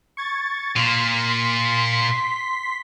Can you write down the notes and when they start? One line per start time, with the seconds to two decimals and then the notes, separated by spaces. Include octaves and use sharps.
0.17 C#6 G#6 A6
0.76 A#2 C6 B6